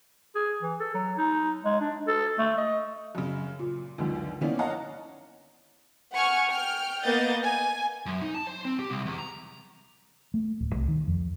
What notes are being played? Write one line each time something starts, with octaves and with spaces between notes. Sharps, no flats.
G#4
E3
A4
F#3
D#4
G#3
D4
A4
A3
D#5
F#2 C#3
A#2
C#2 F#2 D3 D#3 F3
D#3 E3 A#3 B3 C#4 D4
C#5 D#5 F5 F#5 A5 A#5
F#5 G#5 C#6 F6
G5 F6
A#3 B3 D#5 G6 A6
G#5
F#2
D#4
A5
C5
C4
G4
C2
E2
A#5
A3
D1
C2
D#3
F2